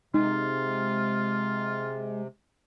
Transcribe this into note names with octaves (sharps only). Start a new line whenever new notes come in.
C3 G#3 D#4 F4